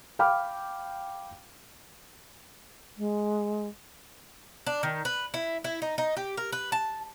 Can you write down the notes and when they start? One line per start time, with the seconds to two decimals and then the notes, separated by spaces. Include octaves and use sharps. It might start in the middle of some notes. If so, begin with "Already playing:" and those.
0.19 F5 G5 B5 D6 F6
2.97 G#3
4.67 D4
4.83 D#3
5.05 B4
5.34 E4
5.64 E4
5.82 D#4
5.98 D#4
6.17 G4
6.37 A#4
6.52 B4
6.72 A5